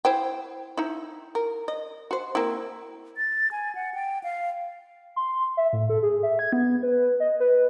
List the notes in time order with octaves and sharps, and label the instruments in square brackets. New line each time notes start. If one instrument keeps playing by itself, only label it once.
[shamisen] E4 C5 G5
D#4 E4
A#4
D#5
F#4 C5
A#3 C4 E4
[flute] A6
G#5
F#5
G5
F5
[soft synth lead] C6
E5
A2
A4
G#4
E5
G#6
B3
B4
D#5
B4